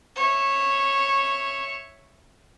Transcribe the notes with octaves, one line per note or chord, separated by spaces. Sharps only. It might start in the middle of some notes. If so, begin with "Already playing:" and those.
C#5 E5